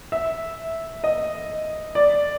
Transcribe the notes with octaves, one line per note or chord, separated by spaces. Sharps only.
E5
D#5
D5